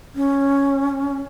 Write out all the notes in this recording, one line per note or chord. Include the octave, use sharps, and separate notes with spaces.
C#4